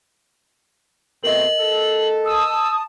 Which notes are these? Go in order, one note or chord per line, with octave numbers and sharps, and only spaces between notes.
B2 A3 C4 A#4 D#5 F#7
A4
A5 D#6 E6